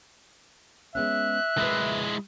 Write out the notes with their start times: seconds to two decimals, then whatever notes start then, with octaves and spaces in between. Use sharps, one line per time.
0.95 G#3 B3 C#4 E5 F#6
1.58 G#3 E4 A#4 B4